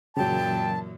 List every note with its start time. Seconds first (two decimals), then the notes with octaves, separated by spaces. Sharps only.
0.17 F#2 A#2 C#3 E3 F#3 G5 A5